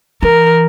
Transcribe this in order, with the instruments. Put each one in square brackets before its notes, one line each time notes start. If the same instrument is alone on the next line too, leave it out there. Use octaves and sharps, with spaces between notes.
[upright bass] E3 [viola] A#4